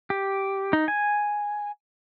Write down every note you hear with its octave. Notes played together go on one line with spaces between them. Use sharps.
G4
D#4
G#5